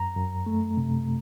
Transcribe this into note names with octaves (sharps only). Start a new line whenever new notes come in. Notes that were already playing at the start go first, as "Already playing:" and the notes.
Already playing: F#2 A#5
F#2
A3
C3